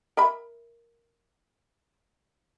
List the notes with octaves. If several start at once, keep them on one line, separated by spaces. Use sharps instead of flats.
A#4 E5 B5